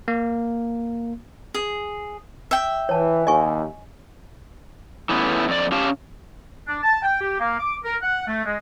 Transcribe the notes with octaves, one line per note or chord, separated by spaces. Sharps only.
A#3
G#4
E5 G5
E3 C#5 A5
D#2 D#5 G#5 C#6
E3 A3 B3 C#4
F2 D5
C#4 G4 F5 A5
D4
A5
G5
G4
A#3
D6
A#4
F#5
A3
G#3